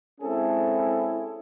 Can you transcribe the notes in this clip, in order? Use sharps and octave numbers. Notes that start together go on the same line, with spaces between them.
G#3 C4 C#4 E4 G#4 A4